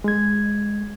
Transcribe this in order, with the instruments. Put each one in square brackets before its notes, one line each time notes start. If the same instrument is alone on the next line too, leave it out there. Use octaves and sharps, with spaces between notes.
[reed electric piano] G#3 G#6